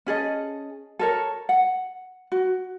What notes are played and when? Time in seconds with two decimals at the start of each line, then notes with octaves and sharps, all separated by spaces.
0.06 C#4 G#4 A4 D#5
0.99 A4 A#4 C#5
1.49 F#5
2.32 F#4